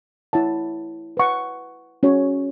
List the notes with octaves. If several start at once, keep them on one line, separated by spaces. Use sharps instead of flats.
E4 C#5 F#5 A5
B4 F#5 C#6
C#4 F#4 C#5